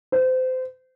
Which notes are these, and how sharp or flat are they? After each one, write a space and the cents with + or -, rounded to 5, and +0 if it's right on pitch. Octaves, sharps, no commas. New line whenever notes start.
C5 -25